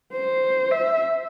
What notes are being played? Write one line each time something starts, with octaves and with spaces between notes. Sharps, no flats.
C5
E5